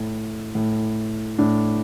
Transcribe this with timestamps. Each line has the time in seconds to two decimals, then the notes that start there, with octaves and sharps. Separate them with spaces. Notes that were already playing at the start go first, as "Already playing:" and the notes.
Already playing: A2
0.55 A2
1.38 A2 D4